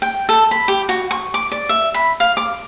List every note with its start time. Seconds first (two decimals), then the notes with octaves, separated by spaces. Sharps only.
0.02 G5
0.29 A4
0.51 B5
0.68 G4
0.89 F#4
1.11 C#6
1.34 D6
1.52 D5
1.69 E5
1.94 B5
2.20 F5
2.37 D6